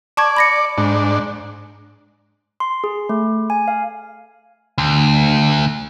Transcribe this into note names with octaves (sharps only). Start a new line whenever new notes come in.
D5 A5 C#6 G#6
B5 A#6 C#7
G#2 D4
C6
G#4
A3
G#5
F5
D2